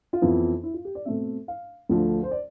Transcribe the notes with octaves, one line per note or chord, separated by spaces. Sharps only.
F4
F2 E3 B3 E4
E4
F4
G4
D5
B2 A3 C4 E5
F5
D2 D3 F3 A3
C5
D5